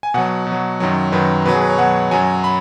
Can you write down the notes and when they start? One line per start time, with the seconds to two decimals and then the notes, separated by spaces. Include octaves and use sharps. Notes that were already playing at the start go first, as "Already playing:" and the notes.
0.03 G#5
0.14 B2 F#3 F#5
0.47 B2
0.52 F#3
0.80 F#2 D#3 F#3
1.12 F#2 D#3 F#3 B4
1.46 B2 F#3 B4
1.54 G#4
1.61 B4
1.70 C#5
1.78 B2 F#3 F#5
2.11 F#2 F#3 G#5
2.44 B5